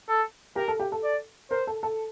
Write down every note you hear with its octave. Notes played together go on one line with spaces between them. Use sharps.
A4
G4 A#4
A4
G4
A4
D5
A#4 C5
A4
A4